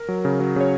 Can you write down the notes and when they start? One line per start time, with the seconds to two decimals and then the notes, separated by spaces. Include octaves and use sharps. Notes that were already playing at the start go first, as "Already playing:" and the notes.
Already playing: A#4
0.08 F#3
0.25 C#3
0.40 F#3
0.56 C#3 C#5